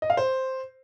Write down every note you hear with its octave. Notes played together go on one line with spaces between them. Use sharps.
D#5
F5
C5